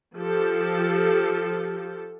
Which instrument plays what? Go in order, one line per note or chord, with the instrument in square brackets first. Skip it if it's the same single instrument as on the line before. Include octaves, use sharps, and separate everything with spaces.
[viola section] F3 G4 A4